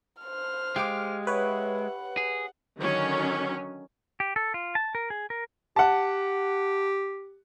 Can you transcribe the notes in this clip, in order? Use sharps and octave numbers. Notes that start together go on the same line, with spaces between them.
C5 F6
G#3 G4 F5 D6
B4 C#5 E5 F#5
F#5
G#4
D3 D#3 F#3 C#4
G4
A4
F4
A5
A#4
G#4
A#4
G4 F#5 A5